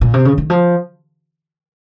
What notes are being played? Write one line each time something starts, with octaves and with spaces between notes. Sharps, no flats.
A#2
C3
C#3
D#3
F3